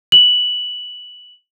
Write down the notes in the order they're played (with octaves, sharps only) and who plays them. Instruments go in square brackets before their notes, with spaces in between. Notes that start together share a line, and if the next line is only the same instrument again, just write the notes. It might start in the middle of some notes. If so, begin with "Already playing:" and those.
[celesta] F#7